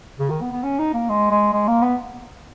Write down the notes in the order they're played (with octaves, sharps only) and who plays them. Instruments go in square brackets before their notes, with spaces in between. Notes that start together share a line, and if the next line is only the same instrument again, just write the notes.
[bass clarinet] C#3
D#3
B3
B3
C#4
D#4
A#3
G#3
G#3
G#3
A#3
B3